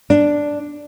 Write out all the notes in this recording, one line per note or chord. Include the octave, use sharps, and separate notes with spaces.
D4